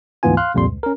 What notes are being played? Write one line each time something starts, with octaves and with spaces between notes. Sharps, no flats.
D2 G#2 E3 B3 F4 G#5
F5 C6 F6 F#6
C2 F2 A#2 G3 C6
C#2
C#4 A#4